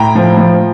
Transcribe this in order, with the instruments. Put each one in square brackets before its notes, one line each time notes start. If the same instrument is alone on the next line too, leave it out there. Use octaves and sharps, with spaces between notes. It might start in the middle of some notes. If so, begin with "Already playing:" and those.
Already playing: [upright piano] A2 G5 A#5
F3
F3